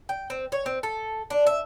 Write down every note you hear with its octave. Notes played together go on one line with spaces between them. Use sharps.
G5
C4
C#5
C4
A4
D4
E5